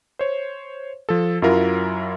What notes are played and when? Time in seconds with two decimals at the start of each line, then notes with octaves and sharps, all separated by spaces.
0.19 C5 C#5
1.09 F3 A4
1.42 F#2 F#3 E4 F4 A#4